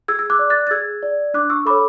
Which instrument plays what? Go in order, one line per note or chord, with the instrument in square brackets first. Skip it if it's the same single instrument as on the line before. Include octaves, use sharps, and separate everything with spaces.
[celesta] G#4 E6 G#6
E6
D6 F#6
D5
F#6 A6
A6
G#4 E6 G#6
D5
D4 D6 F#6
C#6 E6
A4 C#5 B5 D6